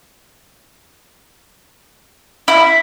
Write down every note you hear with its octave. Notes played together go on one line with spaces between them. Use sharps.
E4